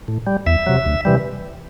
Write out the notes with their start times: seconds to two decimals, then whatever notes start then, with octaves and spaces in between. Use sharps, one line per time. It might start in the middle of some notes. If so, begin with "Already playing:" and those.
0.08 A2
0.27 G3
0.46 E2 E5
0.66 C3 F#3
0.86 D2
1.05 C3 E3 G3